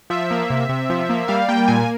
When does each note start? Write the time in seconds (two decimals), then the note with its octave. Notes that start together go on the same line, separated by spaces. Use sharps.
0.10 F3 E5
0.31 A#3
0.50 C3
0.69 C3
0.90 F3
1.09 A#3
1.28 G3 F5
1.49 A#3 G5
1.68 A#2 G#5